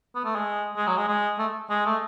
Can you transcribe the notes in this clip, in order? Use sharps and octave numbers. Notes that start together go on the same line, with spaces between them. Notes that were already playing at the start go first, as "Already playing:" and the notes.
B3
A3
G#3
G#3
F#3
G#3
G#3
A3
G#3
A3